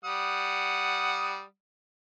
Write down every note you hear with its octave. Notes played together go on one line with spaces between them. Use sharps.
G3 F#5 D#6